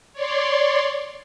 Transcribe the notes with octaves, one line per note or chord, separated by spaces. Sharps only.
C#5 D5 C6